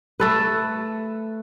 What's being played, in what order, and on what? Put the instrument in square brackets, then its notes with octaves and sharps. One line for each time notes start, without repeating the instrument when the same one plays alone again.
[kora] A3 A4 B4